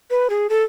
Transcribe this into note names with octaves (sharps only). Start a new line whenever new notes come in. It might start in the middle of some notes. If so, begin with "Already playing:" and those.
B4
G#4
A4